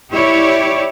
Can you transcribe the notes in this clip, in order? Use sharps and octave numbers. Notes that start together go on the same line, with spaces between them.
E4 G4 C#5 D5